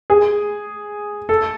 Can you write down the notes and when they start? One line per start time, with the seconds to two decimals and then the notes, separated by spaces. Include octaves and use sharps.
0.10 G#4
1.29 A4